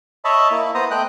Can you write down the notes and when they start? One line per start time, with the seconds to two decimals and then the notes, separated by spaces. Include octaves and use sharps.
0.25 C#5 D#5 E5 A5 B5
0.51 A#3 E4
0.74 B3 C5 A#5 D#6
0.91 A3 D#5 G5 F#6